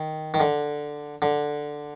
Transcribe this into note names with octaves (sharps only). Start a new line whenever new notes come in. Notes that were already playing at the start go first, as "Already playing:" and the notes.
Already playing: D#3
D#3
D3
D3